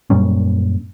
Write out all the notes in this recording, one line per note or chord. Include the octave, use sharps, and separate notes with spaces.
F#2 A#2 G3 C#4